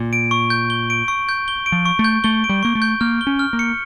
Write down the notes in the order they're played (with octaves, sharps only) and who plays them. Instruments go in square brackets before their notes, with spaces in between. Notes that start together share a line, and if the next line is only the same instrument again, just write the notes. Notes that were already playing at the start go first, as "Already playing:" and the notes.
Already playing: [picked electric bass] A#2
[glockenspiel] D7
C#6
G6
G7
D7
C#6
G6
G7
D7
[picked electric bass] F3
[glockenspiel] C#6
[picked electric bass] A3
[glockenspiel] G6
[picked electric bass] A3 [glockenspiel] G7
[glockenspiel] D7
[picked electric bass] G3
[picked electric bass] A#3 [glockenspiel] C#6
[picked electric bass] A3
[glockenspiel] G6
[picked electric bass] A#3 [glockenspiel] F6
[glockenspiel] G7
[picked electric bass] C#4
[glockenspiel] F6
[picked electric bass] A#3
[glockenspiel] C#7